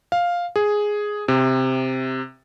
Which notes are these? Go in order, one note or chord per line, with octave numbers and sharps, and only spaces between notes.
F5
G#4
C3